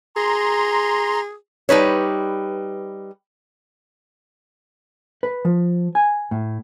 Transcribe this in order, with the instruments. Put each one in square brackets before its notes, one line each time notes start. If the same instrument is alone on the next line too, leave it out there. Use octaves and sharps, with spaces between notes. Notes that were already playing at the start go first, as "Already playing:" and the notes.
[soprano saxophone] G#4 [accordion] A#5 C6
[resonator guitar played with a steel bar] G3 D#4 B4 C#5
[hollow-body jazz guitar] B4
F3
G#5
A2